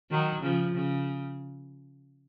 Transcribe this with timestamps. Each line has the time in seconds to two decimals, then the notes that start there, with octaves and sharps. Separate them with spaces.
0.11 D#3 F#3
0.42 C#3 F3
0.75 C#3